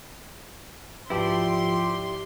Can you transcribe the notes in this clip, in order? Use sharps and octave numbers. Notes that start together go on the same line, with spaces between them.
G#2 F3 E4 G4 B4 D5 C6